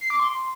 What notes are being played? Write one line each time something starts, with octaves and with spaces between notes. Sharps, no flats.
C7
D6
C6